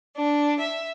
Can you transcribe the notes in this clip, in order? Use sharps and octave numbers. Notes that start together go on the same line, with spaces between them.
D4
E5